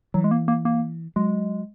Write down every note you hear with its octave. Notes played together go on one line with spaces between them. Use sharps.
E3 F#3
G#3
A#3
A#3
A#3
F#3 G#3